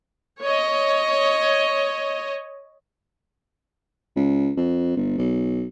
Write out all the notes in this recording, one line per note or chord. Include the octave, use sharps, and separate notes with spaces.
C#5 D#5
C#2
F2
G1
B1